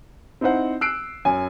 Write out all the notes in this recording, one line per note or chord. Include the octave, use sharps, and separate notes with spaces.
C4 D#4 E4 C5 F#5
E6 F#6 C7 D7
F#2 G#5